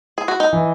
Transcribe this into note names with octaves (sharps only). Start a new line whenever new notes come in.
G#4
F#4
D#4
E3